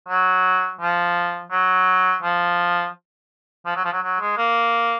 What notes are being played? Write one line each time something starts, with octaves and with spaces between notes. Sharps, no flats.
F#3
F3
F#3
F3
F3
F#3
F3
F#3
F#3
G#3
A#3